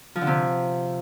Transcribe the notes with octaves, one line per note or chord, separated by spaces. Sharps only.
F3
D3
C3